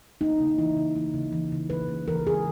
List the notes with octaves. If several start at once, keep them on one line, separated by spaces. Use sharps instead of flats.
A#3 D#4
C#3
E3 E4
C#3
A#3
C#3
E3
C#3
A#3 B4
C#3
E3 A#4
C#3 G#4